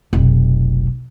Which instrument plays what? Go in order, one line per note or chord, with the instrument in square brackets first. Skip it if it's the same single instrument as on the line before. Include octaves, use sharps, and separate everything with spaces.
[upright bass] F1 B1